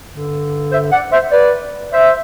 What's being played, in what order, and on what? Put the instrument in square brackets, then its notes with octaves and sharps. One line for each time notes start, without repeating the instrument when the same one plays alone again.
[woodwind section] G2 D3
C5 E5
D5 F#5
C5 E5
B4 D5
C5 E5